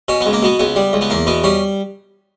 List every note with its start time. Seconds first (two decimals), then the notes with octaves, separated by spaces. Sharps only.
0.08 B2 C#4
0.21 B3
0.26 C#2
0.33 A#3
0.43 B2 B3
0.59 C#2 B3
0.76 G3
0.93 C#2
1.01 B3
1.10 E2 A#3
1.27 B2 B3
1.44 G3 C#4